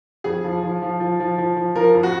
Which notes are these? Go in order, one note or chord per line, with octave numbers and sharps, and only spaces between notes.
F2 G#4
F3
F3
F3
F3
F3
F3
F3
F3 A#4
F2
F#4